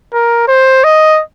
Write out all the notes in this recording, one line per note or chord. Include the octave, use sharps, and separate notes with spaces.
A#4
C5
D#5